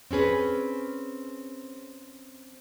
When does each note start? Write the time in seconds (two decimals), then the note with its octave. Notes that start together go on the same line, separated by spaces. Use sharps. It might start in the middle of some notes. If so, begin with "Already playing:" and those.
0.11 C4 C#4 G#4 B4